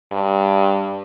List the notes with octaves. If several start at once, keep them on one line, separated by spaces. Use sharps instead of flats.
G2